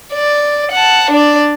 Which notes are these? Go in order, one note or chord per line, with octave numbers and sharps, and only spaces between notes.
D5
F#5 A5
D4 D5